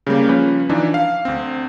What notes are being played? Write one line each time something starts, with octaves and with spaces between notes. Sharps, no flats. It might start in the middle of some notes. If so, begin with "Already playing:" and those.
C#3 G3 A#3
F3 C#4 B4
E3 F3 D4 D#4
F5
D2 C4